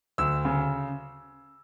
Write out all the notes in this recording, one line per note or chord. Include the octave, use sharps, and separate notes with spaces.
D2 E6
C#3